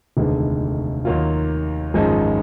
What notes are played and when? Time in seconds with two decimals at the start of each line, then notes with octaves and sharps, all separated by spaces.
0.17 F1 D#2 D3 G#3 B3
1.05 D#2 D#3 F#3 A#3 F4
1.94 G#1 F#2 F3 G#3 D#4